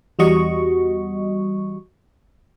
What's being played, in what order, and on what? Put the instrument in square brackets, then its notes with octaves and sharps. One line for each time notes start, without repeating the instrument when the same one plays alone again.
[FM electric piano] E2 G3 F#4 D#5 C#6